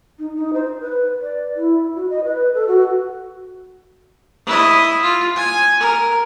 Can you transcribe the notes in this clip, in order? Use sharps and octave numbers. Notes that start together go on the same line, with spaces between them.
D#4
D#4
C5
B4
D5
E4
F#4
D#5
B4
A4
F#4
E4 D#5
F4
G#5
A#4